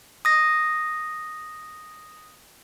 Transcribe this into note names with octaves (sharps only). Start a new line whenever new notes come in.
D#6 A#6